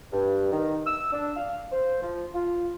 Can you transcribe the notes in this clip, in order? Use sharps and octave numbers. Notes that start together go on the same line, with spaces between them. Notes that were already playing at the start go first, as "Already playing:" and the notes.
G2
D#3
E6
D4
F5
C5
F3
F4